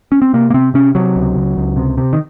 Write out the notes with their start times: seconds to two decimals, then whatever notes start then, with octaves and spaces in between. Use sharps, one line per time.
0.12 C#4
0.22 C4
0.33 C3 A#3
0.50 A#3
0.54 C3 C4
0.74 C3 C#4
0.95 C3 F#3
1.16 C#2
1.37 C#2
1.57 C#2
1.77 C3
1.98 C3
2.13 D#3